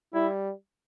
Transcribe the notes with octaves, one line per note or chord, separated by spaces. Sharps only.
G3 E4